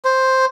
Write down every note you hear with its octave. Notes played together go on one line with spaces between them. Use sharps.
C5